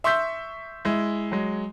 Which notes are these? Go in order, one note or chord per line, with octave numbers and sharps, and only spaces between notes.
E5 C6 C#6 E6 G6 B6
G#3 E4
F#3 G#3